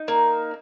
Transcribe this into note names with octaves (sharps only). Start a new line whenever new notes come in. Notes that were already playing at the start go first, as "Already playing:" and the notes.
Already playing: D#4
A#3